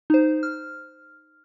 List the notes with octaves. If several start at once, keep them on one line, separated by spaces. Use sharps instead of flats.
D#4 C5
F6